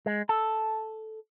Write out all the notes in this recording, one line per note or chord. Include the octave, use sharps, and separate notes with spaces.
G#3
A4